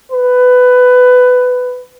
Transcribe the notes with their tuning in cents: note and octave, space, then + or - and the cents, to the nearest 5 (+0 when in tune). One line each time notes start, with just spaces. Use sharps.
B4 +15